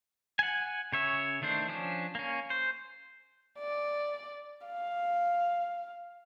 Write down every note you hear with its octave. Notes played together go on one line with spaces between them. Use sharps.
F#5 G#5
C#3 C#5 E5
D#3 A3 D4 C5
F3 C#4 D4
A#3 C#4
C5
D5
F5